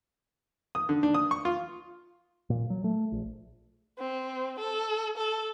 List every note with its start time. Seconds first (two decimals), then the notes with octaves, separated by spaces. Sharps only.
0.75 D#6
0.89 D3
1.03 D4
1.14 D#6
1.31 C#6
1.45 F4
2.50 A#2
2.70 F#3
2.84 A3
3.12 A#1
3.99 C4
4.59 A4
5.17 A4